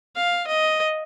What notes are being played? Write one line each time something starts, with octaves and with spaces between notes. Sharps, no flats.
F5
D#5